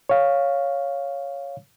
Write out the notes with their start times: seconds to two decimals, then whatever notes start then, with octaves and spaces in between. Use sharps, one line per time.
0.09 C#5 F5